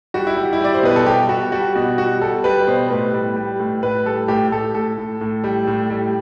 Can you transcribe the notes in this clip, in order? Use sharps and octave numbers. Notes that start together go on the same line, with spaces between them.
G3 F#4
E4
G3
E4
G3 D5
C5
B2 B4
A4
G3 G4
G3 F#4
G3 F#4
B2 F#4
G3 F#4
G3 A4
G3 B4
B2 C5
A2 B4
G3
G3
A2
A2 B4
G3 A4
A2 G4
A2 A4
A2 A4
A2
A2
G3
A2
G3